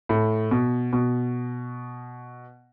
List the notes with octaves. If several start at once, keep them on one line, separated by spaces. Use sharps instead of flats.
A2
B2
B2